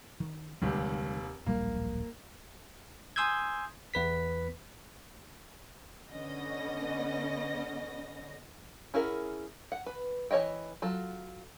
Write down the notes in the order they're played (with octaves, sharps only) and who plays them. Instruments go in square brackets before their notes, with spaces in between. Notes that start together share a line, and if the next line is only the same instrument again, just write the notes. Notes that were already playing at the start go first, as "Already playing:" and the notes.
[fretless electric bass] D#3
[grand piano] F1 D#2 G4 [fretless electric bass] D3 G3 G#3
[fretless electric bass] D1 A#1 G3 [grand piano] A#3
[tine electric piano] G#5 C6 D#6 E6 G6 G#6
E2 B4 B6
[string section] D3 B3 C#4 D#5 A#6
[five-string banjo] C#4 E4 G#4 A#4 F#5
F#5
B4
E3 A#4 C#5 D#5 G5
F#3 F4 A4